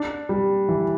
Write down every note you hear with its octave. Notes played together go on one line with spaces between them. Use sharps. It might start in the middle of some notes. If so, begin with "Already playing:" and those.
Already playing: D4
G3
E3